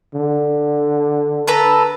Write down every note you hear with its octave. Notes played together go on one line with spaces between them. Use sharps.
D3
A4 B4 A#5